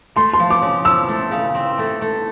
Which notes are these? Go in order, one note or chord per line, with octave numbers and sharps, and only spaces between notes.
A3 C6
C6
F3
D6
C#3
F3 E6
A3
C#3
C4
A3
A3